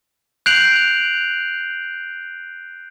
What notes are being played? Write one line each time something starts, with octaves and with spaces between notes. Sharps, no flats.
F#6 G6 C7 D7 F7 F#7